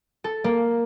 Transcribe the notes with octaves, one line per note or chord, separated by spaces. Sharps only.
A4
A#3